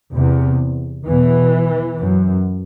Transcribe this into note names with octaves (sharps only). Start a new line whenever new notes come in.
E2 C3
E2 B2 E3
F#2